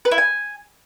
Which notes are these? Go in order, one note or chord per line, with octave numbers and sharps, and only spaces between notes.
B4
E4
G#5